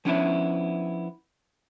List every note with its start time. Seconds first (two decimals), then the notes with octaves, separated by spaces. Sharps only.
0.05 F3 B3 C#4 D4 E4 E5